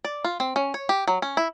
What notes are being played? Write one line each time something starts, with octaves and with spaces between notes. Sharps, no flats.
D5
F4
C4
C#4
C#5
G4
F#3
C#4
E4